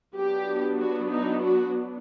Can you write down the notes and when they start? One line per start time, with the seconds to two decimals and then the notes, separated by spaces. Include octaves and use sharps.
0.15 F#3 B3 D4 G4
0.79 F#4
1.11 D#4
1.43 F#4